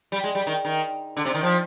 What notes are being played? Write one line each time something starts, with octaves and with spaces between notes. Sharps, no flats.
G3
G#3
G3
D#3
D#3
D3
C3
D#3
F3